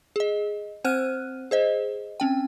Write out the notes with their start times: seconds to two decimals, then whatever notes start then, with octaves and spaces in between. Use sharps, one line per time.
0.16 G#4 D#5
0.84 C4 C5 F#5 F6 F#6 D#7
1.51 G#4 C5 D#5
2.20 C4 C#4 G5